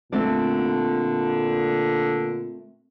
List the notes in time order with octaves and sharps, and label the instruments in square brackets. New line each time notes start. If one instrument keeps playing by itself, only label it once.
[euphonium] A#2 [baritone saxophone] D3 [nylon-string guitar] A3 C4 D5